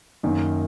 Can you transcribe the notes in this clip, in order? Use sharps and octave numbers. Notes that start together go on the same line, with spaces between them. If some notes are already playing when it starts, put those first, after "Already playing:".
F#2 D#3 A#3